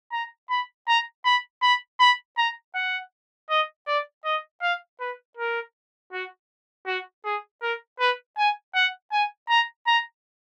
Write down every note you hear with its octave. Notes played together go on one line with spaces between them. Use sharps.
A#5
B5
A#5
B5
B5
B5
A#5
F#5
D#5
D5
D#5
F5
B4
A#4
F#4
F#4
G#4
A#4
B4
G#5
F#5
G#5
A#5
A#5